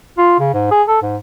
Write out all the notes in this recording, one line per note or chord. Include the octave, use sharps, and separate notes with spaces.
F4
C#3
G#2
G#4
A4
G#2